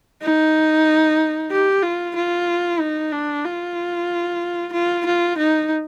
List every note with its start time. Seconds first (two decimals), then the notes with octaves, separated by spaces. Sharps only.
0.22 D#4
1.51 G4
1.83 F4
2.16 F4
2.80 D#4
3.12 D4
3.44 F4
4.73 F4
5.06 F4
5.38 D#4